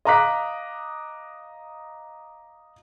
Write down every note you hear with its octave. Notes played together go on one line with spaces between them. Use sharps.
D#5 F5 A#5 D6 F#6 B6